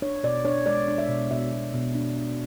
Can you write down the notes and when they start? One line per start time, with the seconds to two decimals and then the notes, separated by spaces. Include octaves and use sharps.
0.02 D4 C#5
0.23 B2 D5
0.45 D4 C#5
0.66 G#3 D5
0.88 D4
0.98 E5
1.09 B2
1.31 B2 E5
1.52 B2
1.74 B2
1.95 D4
2.17 D4